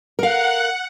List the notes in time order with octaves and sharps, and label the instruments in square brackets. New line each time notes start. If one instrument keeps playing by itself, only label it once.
[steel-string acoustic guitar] A#4 F5 [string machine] F#5